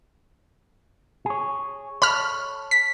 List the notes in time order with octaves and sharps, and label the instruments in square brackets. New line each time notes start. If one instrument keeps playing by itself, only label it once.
[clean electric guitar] G#4 C#5
[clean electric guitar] A4 C#5 [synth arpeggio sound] B5 F6
[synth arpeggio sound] B6